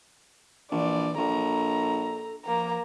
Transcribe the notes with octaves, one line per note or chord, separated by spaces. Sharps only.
A#1 E3 D5
A#1 A4 A#5
F3 A#3 A#5